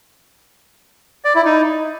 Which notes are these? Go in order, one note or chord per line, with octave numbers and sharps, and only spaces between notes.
D5
E4
D#4